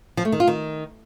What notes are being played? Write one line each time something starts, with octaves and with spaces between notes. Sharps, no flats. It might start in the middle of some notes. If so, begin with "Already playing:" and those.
F3
A3
D#3
F4
D#3